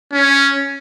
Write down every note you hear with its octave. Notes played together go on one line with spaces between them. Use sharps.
C#4